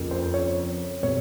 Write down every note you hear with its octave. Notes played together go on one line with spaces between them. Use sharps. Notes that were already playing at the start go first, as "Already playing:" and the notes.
Already playing: F2 C#3 F3 A#3
C5
C#5
B2 G3 C4 C#5